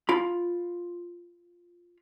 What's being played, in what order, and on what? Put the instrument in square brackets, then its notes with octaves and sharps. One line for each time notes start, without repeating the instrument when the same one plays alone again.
[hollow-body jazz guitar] F4 B5